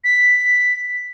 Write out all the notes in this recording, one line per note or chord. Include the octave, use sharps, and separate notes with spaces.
B6